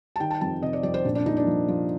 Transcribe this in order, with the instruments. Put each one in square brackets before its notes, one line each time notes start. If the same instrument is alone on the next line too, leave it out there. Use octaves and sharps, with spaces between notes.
[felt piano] A5
D#3 G5
A5
F2 A5
C3 D#5
D5
F2 D5
C5
A#2 D4
D4
A#2 D#4
D4
F3
F3